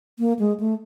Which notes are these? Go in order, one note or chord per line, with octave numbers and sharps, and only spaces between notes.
A#3
G#3
A3